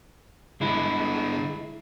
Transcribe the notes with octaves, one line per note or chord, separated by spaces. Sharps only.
G2 D3 G#3 E4